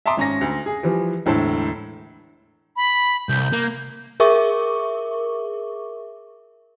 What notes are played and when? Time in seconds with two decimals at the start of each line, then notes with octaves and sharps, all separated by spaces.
0.06 E5 A5 A#5 C6 D6 D#6
0.17 G#1 C#4 A#5 A#6
0.41 D2
0.66 G#4
0.83 E3 F3 G3
1.26 E1 A2 D3 A4 C5 A5
2.76 B5
3.29 C2 G6
3.53 A#3
4.20 G#4 A#4 E5 C#6 D6